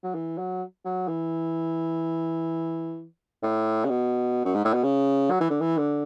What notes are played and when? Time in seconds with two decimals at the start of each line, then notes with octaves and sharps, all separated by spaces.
0.03 F#3
0.15 E3
0.38 F#3
0.85 F#3
1.08 E3
3.43 A2
3.85 C#3
3.89 B2
4.45 F#2
4.54 G#2
4.65 A2
4.74 B2
4.84 C#3
5.30 F#3
5.41 E3
5.50 D3
5.61 E3
5.78 D3